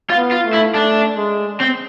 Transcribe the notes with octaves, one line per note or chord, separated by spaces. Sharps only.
F4
B3
F4
A3
E4
A3 D4
G#3
C4